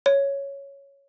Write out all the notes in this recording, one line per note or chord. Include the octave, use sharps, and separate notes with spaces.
C#5